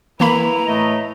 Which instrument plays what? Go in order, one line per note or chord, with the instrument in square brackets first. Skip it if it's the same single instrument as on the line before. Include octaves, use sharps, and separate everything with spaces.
[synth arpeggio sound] E3 A#3 B5 [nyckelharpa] E4 B4 [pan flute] A#5
[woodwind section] A2 A3 D#5